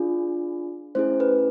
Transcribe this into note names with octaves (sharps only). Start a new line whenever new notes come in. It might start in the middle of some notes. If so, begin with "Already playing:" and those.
Already playing: D4 F4 G#4
A3 C#4 E4 G#4 C5
B4